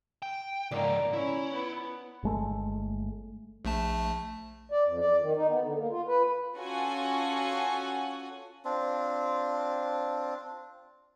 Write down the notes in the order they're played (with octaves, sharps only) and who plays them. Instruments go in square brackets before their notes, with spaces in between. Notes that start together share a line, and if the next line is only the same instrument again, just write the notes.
[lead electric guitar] G5
[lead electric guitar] C#2 G#2 [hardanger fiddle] A#3 D#4 [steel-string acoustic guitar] D5
[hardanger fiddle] C#4 [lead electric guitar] E4
[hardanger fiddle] B3
[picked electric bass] G1 G#3 A3
[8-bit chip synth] A#1 A3 A5
[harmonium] D5
F2
D5
D#3
D#4
B3
D3
A#3
F4
B4
[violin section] C#4 F4 F#4 A4 F#5 G#5
[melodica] C4 D4 F4